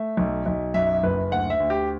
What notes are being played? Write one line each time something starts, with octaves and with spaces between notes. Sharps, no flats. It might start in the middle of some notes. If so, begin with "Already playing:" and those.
Already playing: A3 E5
B1
B1
F#2 E5
F#1 B4
D2 F#5
E5
D2
G4